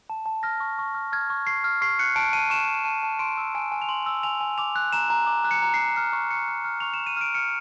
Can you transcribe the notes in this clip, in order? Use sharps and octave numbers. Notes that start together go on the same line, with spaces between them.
A5
A5
F6 A#6
C#6
C#6
F6
F6 G#6
C#6
C#6 C7
F6
C#6 C7
F#6 C#7
A5 D7
A5 D#7
C#6 E7
F#6
A5 D#7
A5
C6 D7
E6
G#5 D7
G#5
F7
C6 F#7
E6
G#5 F7
G#5
D6 F7
F#6
A#5 E7
A#5
D6
F#6
C#7
A#5
A#5 C7
F6 C7
C#6
C#6 C#7
F6
F6
C#6 F7
E7
C#6
D#7
F6 D7
F6 C#7